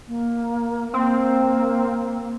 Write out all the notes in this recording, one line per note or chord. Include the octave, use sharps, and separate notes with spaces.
A#3
A#3 C4